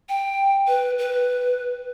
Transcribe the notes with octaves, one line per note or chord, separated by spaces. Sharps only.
G5
B4
B4